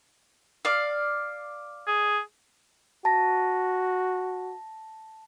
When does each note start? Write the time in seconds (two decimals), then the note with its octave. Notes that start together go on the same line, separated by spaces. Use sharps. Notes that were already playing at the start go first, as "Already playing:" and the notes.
0.65 D5 F5
1.87 G#4
3.05 F#4 A5 A#6